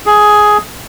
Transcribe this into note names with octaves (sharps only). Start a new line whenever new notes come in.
G#4